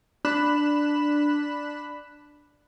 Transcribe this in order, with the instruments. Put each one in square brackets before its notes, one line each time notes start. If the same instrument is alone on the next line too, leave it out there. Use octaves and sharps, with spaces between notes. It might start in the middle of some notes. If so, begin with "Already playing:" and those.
[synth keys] D4 B5 F#6 E7